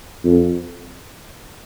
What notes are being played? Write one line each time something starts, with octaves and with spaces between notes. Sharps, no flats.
F2